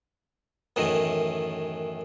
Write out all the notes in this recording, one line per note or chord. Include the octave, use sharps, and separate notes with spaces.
F#2 A2 D#3 E3